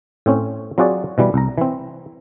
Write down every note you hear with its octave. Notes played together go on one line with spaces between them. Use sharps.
A2 C4 C#4
F#3 C4 F4 F#4 G#4 D5
B2 E3 G3
C2 A#5
E3 C4